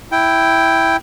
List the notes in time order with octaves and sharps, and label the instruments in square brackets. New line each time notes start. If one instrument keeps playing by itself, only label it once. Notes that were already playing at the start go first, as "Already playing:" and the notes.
[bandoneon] E4 G5